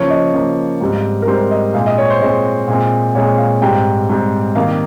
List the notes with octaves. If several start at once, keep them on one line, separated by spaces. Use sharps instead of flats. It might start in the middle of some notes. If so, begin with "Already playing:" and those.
Already playing: C#3 F3 A#3 C#5
D#5
C#3 F3 A#3
G#2 G3 C4
A#4
G#2 G3 C4 C5
D#5
A#2 G#3 C4 F5
D#5
C#5
C5
A#2 G#3 C4 D#5
A#2 G#3 C4
A#2 G#3 C4 C#5
F5
G#2 G3 C4 G5
G#2 G3 C4
C3 D#3 G3 A#3 F5